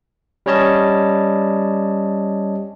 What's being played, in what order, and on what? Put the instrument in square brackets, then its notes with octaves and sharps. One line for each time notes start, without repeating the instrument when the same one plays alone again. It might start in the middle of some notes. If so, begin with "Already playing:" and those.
[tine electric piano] G3 C#4 C#5 D#5 A5